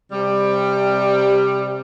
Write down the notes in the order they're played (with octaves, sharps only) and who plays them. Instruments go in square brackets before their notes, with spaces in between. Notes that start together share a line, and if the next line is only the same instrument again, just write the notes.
[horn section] C3 G3